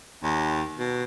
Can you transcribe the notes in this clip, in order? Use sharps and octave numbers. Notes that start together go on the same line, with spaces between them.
D#2
B2